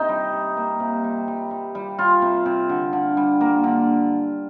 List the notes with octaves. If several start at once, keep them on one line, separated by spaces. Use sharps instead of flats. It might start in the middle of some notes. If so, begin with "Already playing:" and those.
Already playing: C3 D#4
G3
C3
A#3
C3
G3
G3
G3
G3
G3 F4
C3
C3
D3
D3
G3
A#3
D3